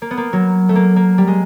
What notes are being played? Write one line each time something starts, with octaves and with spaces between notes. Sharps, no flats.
A#3
B3
A#3
F#3
A3
A#3
A#3
G3
G#3